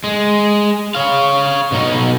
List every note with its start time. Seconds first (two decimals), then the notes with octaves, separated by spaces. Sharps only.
0.04 G#3
0.95 C#5 F5
1.72 B2 D#4